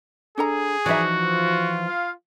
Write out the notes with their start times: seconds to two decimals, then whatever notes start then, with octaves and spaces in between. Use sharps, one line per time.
0.38 D4 G#4 A4 A#5
0.86 E3 F3 D#4 F#4 D5 E5
1.22 F4
1.88 F5